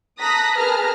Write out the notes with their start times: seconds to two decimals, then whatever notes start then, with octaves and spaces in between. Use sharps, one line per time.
0.20 A5 A#5 D#6 F#6 A#6 B6
0.56 G#4 A#4 B4 A5 A#5 F6